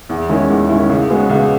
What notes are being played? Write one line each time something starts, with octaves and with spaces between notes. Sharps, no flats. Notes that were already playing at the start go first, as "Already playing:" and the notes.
E2
D#3 G#3 C#4 E4
E2
D#3 G#3 C#4 E4
C#2
C#3 G#3 B3 F#4
C#2